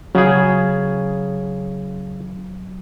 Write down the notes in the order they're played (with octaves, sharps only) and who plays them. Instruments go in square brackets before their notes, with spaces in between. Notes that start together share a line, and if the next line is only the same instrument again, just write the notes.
[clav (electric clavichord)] C#3 G#4 [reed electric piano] F#3